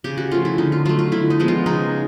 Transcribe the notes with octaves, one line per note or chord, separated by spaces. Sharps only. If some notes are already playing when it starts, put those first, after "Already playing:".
C#3 G4
F#4
F3 A3 F4
E4
D3 D#4
F4
F#3 A3 F4
F4
D3 E4
D#4
F3 G#3 B3
F4
C#3 D#4